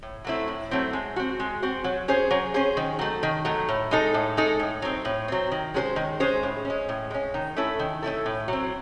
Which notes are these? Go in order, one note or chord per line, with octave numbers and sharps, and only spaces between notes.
A2
F#3 A3 C4 E4
A2
F#3 A3 C4 E4
G#3
C4 F#4
G#3
C4 F#4
F#3
C#4 G#4 C5
F#3
C#4 G#4 C5
D#3
F#3 A3
D#3
F#3 A3
A2
G#3 D#4 A4
A2
G#3 D#4 A4
A2
F#3 C4
A2
F#3 C4
D#3
G#3 C#4 G#4 C5
D#3
G#3 C#4 G#4 C5
A2
C#4
G#3
A2
G#3 C#4
D#3
A3 C#4 E4 A4
D#3
A3 C#4 E4 A4
A2
F#3 C4